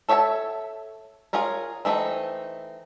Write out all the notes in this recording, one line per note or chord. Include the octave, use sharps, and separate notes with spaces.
A4 C#5 E5 G5 A5
F4 G#4 A#4 C#5
E3 A3 C4 D#4